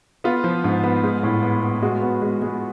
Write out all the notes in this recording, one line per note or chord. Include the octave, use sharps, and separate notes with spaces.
B3 F4
F3
G#2
B3
G#3
A2
B3
B3
G#3 F#4
B3
G#3
G#3